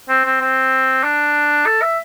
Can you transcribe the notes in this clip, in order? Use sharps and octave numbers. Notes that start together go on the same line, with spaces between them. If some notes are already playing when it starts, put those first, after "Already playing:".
C4
C4
C4
D4
A4
E5